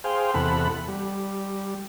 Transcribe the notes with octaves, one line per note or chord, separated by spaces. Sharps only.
G#4 C5 F5 G5
E2 C3 A4 F#5 B5
G3